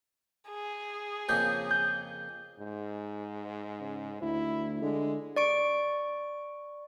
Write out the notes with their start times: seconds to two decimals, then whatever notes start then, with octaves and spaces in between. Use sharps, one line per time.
0.50 G#4
1.29 F2 C#3 A#3 G6
1.70 G6
2.59 G#2
3.80 C#3
4.21 D2 E4
4.81 D3 G#3
5.36 D5 C#6 D7